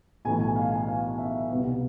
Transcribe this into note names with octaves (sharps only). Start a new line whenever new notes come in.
B1 A2 E3 B3 G#5
G#5
F5
G#5
F5
E5
C2 B2 B3